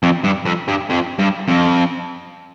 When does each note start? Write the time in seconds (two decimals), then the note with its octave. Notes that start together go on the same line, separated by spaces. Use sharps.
0.03 F2
0.24 G2
0.46 F2
0.68 G2
0.90 F2
1.19 G2
1.48 F2